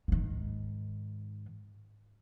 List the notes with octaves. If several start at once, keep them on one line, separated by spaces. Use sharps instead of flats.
G#2 D#3